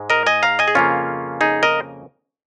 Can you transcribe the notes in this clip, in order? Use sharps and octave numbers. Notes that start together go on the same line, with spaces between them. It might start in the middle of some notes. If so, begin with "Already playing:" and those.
Already playing: G#2 G#3
A#4 D#5
D#5 G#5
F5 A#5
D#5 G#5
G#4
F2 C#3 A#3 C#4 F4
D#4 G#4
A#4 D#5